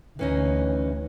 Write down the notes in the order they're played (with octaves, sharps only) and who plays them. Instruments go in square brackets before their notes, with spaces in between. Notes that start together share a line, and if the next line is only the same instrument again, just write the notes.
[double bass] D2 [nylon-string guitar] E3 C#4 D#4